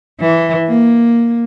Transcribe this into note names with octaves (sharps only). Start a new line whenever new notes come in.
E3
A#3